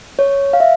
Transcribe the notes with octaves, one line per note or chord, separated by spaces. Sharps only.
C#5
F5
E5